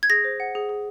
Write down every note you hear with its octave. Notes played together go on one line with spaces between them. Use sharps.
G#6
G#4 A#6
C5
F#5
G#4
G#4